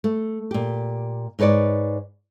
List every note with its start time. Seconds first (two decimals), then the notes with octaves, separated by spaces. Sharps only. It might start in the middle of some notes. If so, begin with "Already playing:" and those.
0.04 A3
0.51 A#2 G4
1.39 G#2 D#4 B4 C#5 D5